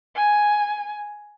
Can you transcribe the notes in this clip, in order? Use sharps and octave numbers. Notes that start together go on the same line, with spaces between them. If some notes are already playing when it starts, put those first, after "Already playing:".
G#5